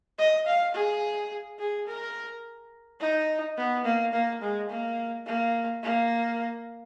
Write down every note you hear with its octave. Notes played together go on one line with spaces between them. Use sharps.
D#5
F5
G#4
G#4
A#4
D#4
B3
A#3
A#3
G#3
A#3
A#3
A#3